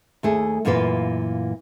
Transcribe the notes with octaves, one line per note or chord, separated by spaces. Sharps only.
D#2 A3 G#4
F#2 A#2 E3 F4 B4 F5